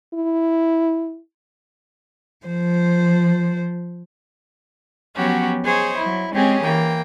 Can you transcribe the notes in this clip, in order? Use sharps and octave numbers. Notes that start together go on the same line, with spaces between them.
E4
F3 C5
F3 F#3 B3 C#4 F#4 G4
G#4 C5 C#5 D#5
F#3 E4
G#3 C4 C#4 G4 G#4
E3 A#3 G5